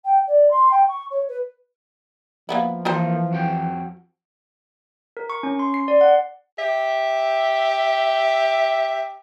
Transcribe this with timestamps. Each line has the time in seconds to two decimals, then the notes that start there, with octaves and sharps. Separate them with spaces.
0.04 G5
0.27 D5
0.50 C6
0.71 G5
0.88 C#6
1.10 C#5
1.28 B4
2.49 F3 A#3 B3 E4
2.85 E3 A#3 F4 A4 A#4 C5
3.31 F2 F#4 G5
5.17 A#4
5.30 C#6
5.43 C#4
5.59 C6
5.74 C7
5.88 D5
6.01 F#5
6.59 G4 E5